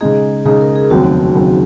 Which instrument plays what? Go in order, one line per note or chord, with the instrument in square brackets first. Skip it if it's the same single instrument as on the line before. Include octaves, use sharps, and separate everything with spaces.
[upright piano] C#3 G#3 D#4 [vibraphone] G#4
[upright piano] C#3 G#3 D#4 [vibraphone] G#4
[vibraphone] A#4
G#4
[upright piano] F1 D#2 C#3 F#3 C4 [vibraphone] F#4
[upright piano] F1 D#2 C#3 F#3 C4